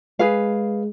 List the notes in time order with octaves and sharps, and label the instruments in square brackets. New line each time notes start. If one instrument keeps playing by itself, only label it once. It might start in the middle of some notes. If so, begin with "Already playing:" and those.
[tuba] G#3 [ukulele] G#4 B4 F5